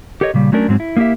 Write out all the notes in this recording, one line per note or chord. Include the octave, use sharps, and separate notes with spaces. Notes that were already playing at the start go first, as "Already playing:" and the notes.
G4 A4 A#4 C#5 D#5
A#2 C#3 G3
F#3 A3 C#4 D4 A#4
G#2 F#3 G#3 C4
E4
A#3 D#4 E4 G4 E5